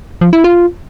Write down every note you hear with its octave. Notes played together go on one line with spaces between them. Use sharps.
F3
E4
F4